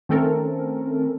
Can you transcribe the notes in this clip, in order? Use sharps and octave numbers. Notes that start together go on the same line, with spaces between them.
D#3 A3 C4 C#4 A4 A#4